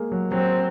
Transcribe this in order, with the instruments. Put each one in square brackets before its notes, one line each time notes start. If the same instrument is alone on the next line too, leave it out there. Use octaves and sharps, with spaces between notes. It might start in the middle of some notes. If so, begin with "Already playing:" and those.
Already playing: [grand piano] G#3 A#3
F#3
[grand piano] F#3 [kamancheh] C4